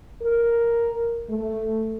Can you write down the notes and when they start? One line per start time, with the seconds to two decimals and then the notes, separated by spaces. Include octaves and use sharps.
0.22 A#4
1.29 A3